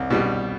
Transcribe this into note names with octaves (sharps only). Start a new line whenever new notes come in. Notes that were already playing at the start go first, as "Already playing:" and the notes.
Already playing: C2
B2 G3